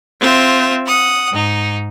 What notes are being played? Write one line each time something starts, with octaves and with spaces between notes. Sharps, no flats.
C4 F4 E5
F#5 D#6
G#2 D#4